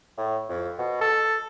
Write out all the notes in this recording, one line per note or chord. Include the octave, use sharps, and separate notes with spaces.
A2
F2
B2
A4